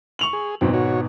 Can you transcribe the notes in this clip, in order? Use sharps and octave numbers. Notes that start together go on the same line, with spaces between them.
C#6 F7 F#7
G#4
G#1 G#2 B2 F#3 C4
F#4 C#5